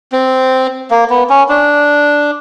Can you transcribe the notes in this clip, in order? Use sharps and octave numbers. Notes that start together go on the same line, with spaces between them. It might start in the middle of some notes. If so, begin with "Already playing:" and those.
C4
A#3
B3
C#4
D4